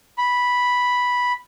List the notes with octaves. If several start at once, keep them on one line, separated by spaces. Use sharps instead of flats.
B5